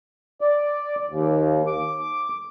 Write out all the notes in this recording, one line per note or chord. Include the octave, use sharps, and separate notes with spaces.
D5
D#2
D6